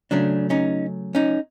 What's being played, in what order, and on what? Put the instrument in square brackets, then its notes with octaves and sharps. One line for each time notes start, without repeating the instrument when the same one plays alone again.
[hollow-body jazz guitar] C#3 F#3 A3 C#4 D4
C#4 D#4
C#4 D#4